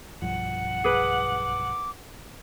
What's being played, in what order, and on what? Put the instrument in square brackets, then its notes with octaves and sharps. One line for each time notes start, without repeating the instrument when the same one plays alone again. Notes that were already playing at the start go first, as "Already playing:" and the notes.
[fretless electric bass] B1 G2 F3 [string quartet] F#5
[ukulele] G#4 B4 [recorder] D6